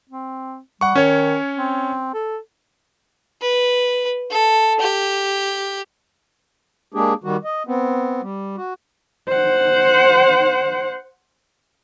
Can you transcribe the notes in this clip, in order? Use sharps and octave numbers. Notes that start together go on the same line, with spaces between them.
C4
G3 F#5 C#6
D#3 C#4 C#5
C4
A4
B4
A4
G4
G#3 A#3 D4 G4 G#4
D#3 G3 F#4
D#5
B3 C4
G3
F#4
C5 F#5